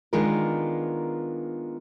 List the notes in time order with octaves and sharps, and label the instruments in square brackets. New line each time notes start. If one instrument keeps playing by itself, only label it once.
[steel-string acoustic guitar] D#3 G#3 B3 D4 F4 A#4